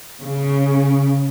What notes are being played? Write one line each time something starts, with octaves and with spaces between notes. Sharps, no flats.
C#3